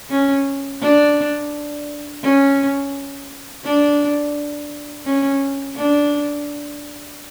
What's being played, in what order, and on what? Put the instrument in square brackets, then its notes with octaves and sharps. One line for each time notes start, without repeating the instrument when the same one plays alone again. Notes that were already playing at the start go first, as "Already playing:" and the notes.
[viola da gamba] C#4
D4
C#4
D4
C#4
D4